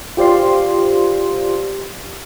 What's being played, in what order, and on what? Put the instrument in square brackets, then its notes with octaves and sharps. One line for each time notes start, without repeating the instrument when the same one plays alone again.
[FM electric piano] F4 G4 C5 D5 F5 C6